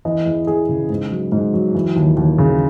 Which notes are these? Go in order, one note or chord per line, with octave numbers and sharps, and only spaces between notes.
E3 D#5
E2
E2 G#4
C#3
G#2
F#3
G#2
F#3
E3
D#2
D#2
C#3